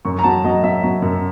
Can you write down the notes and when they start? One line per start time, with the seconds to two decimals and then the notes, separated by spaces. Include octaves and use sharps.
0.05 F#2 C#6
0.19 A#5
0.24 F#3 A5
0.44 F#3 D#5
0.63 F#3 E5
0.83 F#3
1.02 F#2